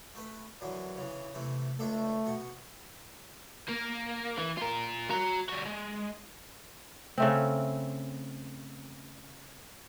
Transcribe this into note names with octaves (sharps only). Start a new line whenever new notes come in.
A3 B4
F#2 D3 E3
C#3 E3
C3 E3 A3
C#2 A3 D4 A4
B2 F#5
A#3
E3
F4 A#4
F#4 A#5
G3 F#4
G#3
C#3 A3 C4